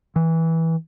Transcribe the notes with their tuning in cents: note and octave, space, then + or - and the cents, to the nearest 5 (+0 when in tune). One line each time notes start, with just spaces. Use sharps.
E3 -15